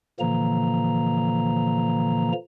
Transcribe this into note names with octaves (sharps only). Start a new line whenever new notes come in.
A#2 D3 E3 F3 A#3 A#5